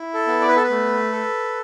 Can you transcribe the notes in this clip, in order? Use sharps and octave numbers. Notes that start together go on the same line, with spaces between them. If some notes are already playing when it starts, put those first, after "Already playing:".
Already playing: E4
A4
B3
D5
B4
A4
B4
A3
A4